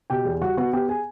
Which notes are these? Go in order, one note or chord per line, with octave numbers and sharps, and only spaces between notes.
B2 G4 G5
E2
G3 F#4 F#5
B3 F#4 F#5
B3 G4 G5
G#4 G#5